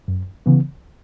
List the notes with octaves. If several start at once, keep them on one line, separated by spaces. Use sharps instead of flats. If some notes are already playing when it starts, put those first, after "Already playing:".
F#2
C#3 E3 B3